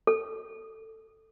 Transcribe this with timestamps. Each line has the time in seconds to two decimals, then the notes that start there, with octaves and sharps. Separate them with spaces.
0.07 A4